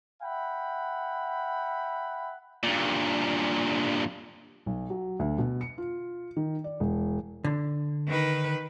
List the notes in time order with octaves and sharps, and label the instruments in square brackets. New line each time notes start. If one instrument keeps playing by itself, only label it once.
[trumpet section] E5 F#5 G5 B5
[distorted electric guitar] G2 A#2
[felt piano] B1
F#3
D2
B2
C#7
F4
D#3
D5
E1
[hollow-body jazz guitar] D3
[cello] D#3 B4